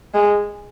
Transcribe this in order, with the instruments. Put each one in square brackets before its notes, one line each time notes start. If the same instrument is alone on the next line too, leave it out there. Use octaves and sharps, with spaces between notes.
[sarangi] G#3